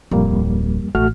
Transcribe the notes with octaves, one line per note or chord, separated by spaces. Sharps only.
D1 F2 G3 A#3
A1 A3 F#4 F6